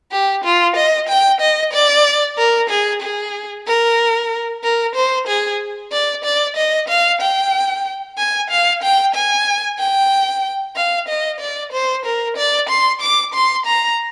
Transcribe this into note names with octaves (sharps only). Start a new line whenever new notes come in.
G4
F4
D#5
G5
D#5
D5
A#4
G#4
G#4
A#4
A#4
C5
G#4
D5
D5
D#5
F5
G5
G#5
F5
G5
G#5
G5
F5
D#5
D5
C5
A#4
D5
C6
D6
C6
A#5